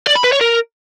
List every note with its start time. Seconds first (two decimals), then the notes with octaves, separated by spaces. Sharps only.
0.07 D5
0.16 B5
0.24 B4
0.32 C#5
0.41 A#4